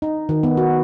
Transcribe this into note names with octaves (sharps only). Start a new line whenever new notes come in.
D#4
D#3
B3
F#4